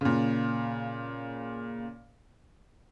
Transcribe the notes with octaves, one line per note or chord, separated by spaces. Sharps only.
A#2 C#3